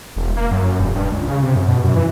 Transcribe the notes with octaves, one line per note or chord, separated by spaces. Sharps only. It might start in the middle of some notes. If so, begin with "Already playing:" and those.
E1
A#3
F#2
E1
G2
C#2
C#3
C3
F#2
B2
F#2
E3